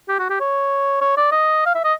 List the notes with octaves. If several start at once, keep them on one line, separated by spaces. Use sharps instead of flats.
G4
F#4
G4
C#5
C#5
D5
D#5
F5
E5
D#5